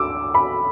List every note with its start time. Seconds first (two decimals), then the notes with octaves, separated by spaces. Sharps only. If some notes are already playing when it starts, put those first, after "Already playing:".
Already playing: D2 D6 E6
0.35 B5